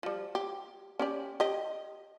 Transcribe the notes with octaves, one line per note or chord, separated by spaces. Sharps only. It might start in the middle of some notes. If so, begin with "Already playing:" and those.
F3 G3
G4
C#4 G4 D5
G4 D#5